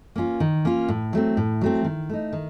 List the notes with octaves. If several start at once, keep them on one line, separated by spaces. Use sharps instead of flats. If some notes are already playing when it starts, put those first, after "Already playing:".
A#3 C#4 F4
D#3
A#3 C#4 F4
A2
F#3 A3 C4
A2
F#3 A3 C4
D#3
A3 D#4
D#3